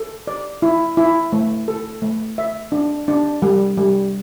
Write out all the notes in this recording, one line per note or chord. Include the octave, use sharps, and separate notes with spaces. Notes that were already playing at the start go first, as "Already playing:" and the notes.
Already playing: A4
D5
E4
E4
A3
A4
A3
E5
D4
D4
G3
G3